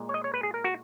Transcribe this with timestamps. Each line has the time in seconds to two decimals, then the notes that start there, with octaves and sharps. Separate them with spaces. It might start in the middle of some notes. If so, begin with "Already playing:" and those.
Already playing: A#2 G#3
0.09 C#5
0.14 D#5
0.24 C#5
0.34 B4
0.43 G#4
0.54 A#4
0.64 F#4